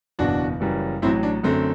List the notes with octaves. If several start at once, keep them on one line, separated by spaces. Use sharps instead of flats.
F#1 E2 B2 D4 F#4
F#1 F#2 E3 G3
A1 A2 F#3 C4 E4
D4
F#2 D3 A3 C4